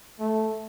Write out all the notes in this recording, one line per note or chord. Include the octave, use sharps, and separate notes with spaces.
A3